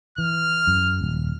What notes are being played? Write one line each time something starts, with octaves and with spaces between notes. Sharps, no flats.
E3 F6
F#2
D#1